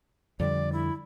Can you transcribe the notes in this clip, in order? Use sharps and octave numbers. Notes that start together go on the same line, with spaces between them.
F2 D3 G3 D5
E4